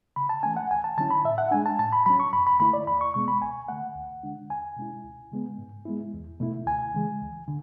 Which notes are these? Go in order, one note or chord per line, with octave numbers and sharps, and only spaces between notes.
C#3 B5
A5
E3 A3 C#4 G#5
F#5
D2 G#5
A5
D3 F#3 C#4 E4 A5
B5
A2 E5
F#5
G#3 D4 G#5
A5
A2 A5
B5
F#3 C#4 B5
C#6
F#2 B5
B5
D3 A3 E4 B5
D5
E2 B5
C#6
B2 G#3 B3 C#6
B5
D2 G#5
D3 A3 F#5
D2
D3 G#3 D4
E2 G#5
B2 G#3 C#4 E4
D2
C#3 G#3 B3
G#2
G#3 B3 E4
E2
B2 A3 E4
D2 G#5
C#3 E3 G#3
D2
D3